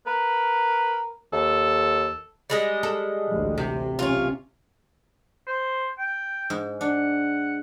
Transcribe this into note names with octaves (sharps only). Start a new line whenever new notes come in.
A#4 B4
D#2 A4
G3 G#3 D#5
A4
A1 D2 G#2
C3
B1 C#4 F4 C#5
C5
G5
G#2
D4 F#5